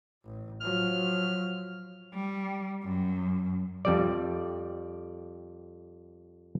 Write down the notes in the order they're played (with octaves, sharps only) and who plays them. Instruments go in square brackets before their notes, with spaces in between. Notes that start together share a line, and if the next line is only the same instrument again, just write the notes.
[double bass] A1
[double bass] F3 F#3 [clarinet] F6
[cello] G3
F#2
[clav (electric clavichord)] F2 G3 D5